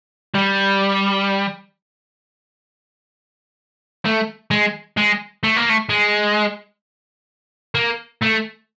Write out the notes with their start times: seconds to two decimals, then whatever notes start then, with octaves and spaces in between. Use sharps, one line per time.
0.35 G3
4.05 A3
4.51 G#3
4.97 G#3
5.44 A3
5.57 A#3
5.70 A3
5.90 G#3
7.75 A#3
8.22 A3